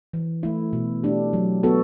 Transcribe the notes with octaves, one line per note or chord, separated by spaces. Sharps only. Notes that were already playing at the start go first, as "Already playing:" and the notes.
E3
A3 E4
B2
A3 D4 G4
F#3
B3 F#4 A4